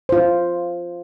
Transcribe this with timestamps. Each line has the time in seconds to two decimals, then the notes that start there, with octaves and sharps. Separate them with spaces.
0.09 F4 C5